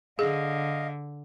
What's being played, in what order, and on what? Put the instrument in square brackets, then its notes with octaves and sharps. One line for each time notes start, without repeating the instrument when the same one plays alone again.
[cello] D3 [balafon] G#4 [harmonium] D#5 F5